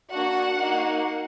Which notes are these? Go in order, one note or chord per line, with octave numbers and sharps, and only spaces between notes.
A#3 D4 F#4 F#5
A#3 D#4 F#4